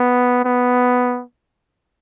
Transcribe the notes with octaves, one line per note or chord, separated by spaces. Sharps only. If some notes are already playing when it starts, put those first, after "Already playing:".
Already playing: B3
B3